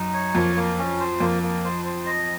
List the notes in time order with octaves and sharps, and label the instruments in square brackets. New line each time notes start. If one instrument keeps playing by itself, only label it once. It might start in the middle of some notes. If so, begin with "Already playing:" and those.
Already playing: [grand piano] F#2 [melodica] D#4
[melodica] C#5
[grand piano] F2 [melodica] A#3
[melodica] A#3
C#4
C5
[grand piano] F2 [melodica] A#3
[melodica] A#3
C5
C5
D#5